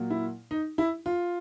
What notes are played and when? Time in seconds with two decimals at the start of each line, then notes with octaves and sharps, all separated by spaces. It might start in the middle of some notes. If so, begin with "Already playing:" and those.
Already playing: A#2 F#3 A#3
0.10 E4
0.51 D#4
0.78 E4
1.06 F4